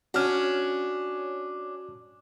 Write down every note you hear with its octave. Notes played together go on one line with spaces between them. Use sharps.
C#4 D4 F#4 F6